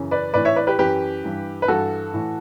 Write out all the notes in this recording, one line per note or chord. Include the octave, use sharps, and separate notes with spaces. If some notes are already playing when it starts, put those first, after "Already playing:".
Already playing: F#2 C#3 E3
B4 D5
A2 E3 B4 D5
C#5 E5
B4 D5
G4 B4
F#2 E3 G4 B4
G2 E3
B4
G2 E3 F#4 A4
A2 E3